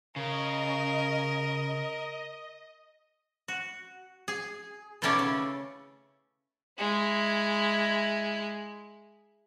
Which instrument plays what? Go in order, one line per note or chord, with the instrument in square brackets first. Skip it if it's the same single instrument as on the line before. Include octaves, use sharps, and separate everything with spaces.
[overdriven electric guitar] C#3 [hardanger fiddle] A#4 [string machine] D#5
[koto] F#4
G#4
B2 D#3 A3 C#4 E4 D5
C#3
[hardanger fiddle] G#3 E4